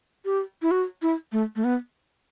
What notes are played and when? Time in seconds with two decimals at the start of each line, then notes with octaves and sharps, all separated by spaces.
0.25 G4
0.62 E4
0.71 F#4
1.02 E4
1.32 A3
1.56 A3
1.64 B3